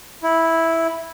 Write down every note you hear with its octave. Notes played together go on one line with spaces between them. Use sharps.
E4